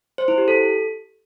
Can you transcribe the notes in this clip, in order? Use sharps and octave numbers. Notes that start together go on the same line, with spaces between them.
C5
E4
G4
A4